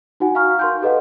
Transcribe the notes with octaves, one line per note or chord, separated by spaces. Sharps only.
D#4 F#4 F#5 G#5
F5 G#5 A#5 C#6 F6
A#4 C6 G6
G4 A4 B4 D#5 F5 F#5